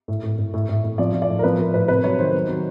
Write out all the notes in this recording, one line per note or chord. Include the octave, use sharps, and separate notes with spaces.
A2
A2
A2
A2
A2
A2
F3 D5
F3
D5
A2
A#4
F3 B4
F3 A#4
A2 B4
C3 B4
F#3 C#5
D#3 C5
F#3
F#3